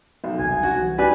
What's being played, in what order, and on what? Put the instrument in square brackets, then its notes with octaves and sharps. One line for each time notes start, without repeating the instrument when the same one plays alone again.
[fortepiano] B1
[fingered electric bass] E1 C2 [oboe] G#5
[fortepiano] F#4
[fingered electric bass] C2 E3
[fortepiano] G4 D5 G#5 [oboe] B4